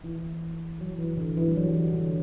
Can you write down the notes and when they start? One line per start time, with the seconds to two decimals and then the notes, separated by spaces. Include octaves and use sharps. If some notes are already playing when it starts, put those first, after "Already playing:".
0.04 E3 E4
0.81 F#3
0.99 E3
1.17 D3
1.37 E3
1.48 G3
1.56 F#3
1.74 E3
1.93 D3